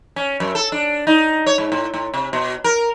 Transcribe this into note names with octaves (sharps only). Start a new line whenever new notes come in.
C#4
F#2
A4
D4
D#4
C#5
G#2
A2
A2
C3
B2
A#4